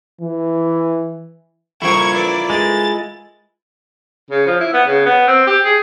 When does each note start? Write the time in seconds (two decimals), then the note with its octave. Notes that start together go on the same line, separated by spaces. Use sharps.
0.21 E3
1.82 E3 G3 E4 F4 A#4 C#6 G#6
2.15 A4 B4 D5
2.50 G#3 A6
4.31 C#3
4.46 F3
4.60 E4
4.74 B3
4.87 C#3
5.06 B3
5.28 C4
5.47 G4
5.65 G#4